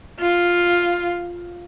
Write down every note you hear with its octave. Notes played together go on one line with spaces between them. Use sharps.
F4